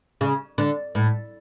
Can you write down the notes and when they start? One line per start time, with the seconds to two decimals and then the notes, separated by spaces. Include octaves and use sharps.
0.21 C#3
0.58 D3
0.95 A2